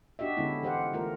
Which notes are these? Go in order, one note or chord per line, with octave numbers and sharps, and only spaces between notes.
D4 F#4 G4 D#5 E5
D3 G#3 B3 C#4 E4
E3 G4 C5 F5 F#5
E3 A3 F4 A#4